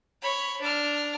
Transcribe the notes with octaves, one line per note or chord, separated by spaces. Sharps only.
C#5 B5
D4 F6